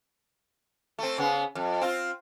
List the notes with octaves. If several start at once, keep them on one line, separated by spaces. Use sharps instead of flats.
A3 C4
C#3 B3
F2
C4 F4